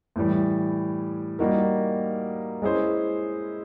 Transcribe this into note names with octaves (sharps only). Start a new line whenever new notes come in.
A2 E3 G3
G3 A#3 D#4 F#4 A#4
G#3 C#4 E4 G#4 C5